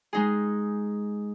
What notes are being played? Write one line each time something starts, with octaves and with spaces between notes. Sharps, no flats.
G#3 D#4 G#4